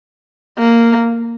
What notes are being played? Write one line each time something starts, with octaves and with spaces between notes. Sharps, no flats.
A#3